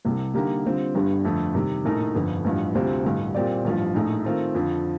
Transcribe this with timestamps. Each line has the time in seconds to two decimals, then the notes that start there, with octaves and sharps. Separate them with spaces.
0.05 C2 C3 G3
0.34 D3 G3 A#3 D#4 G4
0.65 D3 G3 C4 F4
0.95 G1 G2 D3 G3
1.25 F2 D3 A3
1.55 C3 D#3 G3
1.85 A#1 A2 A3 D#4 A#4
2.15 G1 F2 D3
2.45 A1 G2 F3
2.74 D2 C3 G3 C4 F4
3.05 A1 G2 D3
3.35 A#2 G3 C4 G4 D5
3.65 A1 G2 F3
3.94 A#1 A2 A3 D#4
4.24 D#3 A3 C4 F4 A#4
4.54 F2 D3 F3